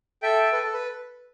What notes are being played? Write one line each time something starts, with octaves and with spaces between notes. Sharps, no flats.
A4 E5 G5
A4 B4
A4
B4